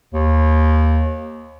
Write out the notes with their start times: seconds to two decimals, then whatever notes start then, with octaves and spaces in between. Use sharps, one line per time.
0.14 D#2